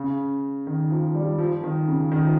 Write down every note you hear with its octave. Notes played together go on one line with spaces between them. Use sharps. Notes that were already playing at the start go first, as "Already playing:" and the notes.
Already playing: C#3
D#3
F3
G3
F3
D#3
C#3
D#3
F3